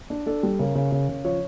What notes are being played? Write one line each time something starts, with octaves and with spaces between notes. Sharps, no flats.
D4
D4 A4
G3
C#3 A#4
C#3
C#3
C#3
F3 C#5